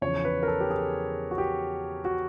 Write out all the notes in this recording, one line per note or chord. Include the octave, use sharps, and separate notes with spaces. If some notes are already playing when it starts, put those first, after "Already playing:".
E2 C#3 F3 C#5
B4
A#4
A4
G4
G#4
F#4
G4
F#4